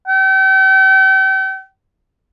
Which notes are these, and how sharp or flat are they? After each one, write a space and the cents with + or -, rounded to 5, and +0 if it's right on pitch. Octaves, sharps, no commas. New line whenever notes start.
G5 -40